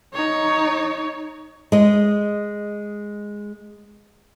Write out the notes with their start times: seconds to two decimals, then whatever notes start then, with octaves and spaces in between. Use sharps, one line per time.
0.14 D#4 C#5
1.72 G#3 D#5